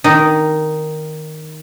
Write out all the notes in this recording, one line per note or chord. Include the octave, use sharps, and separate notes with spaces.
D#3 D#4